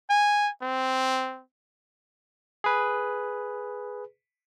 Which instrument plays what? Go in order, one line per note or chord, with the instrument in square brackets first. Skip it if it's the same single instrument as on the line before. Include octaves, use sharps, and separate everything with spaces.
[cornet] G#5
C4
[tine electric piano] G#4 B4